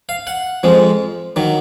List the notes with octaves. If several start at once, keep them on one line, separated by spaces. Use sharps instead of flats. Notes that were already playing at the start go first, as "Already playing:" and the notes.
F5
F#5
F2 F3 G#3
D#3 F#3